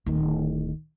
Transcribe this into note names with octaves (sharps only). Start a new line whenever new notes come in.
D1 D#3